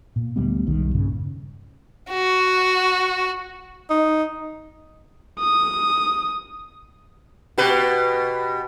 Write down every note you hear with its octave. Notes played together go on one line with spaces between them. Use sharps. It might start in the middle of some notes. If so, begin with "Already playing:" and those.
A#2
D2 G3 B3
E1 B1 D#3 G3
G2 A#2 C#3
F#4
D#4
D#6
B2 G4 B4